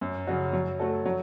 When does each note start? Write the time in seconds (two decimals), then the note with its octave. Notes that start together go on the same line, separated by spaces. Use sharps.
0.01 F#2
0.27 C#3 F#3 C#4 F#4
0.53 F#3
0.80 A3 F#4 A4
1.05 F#3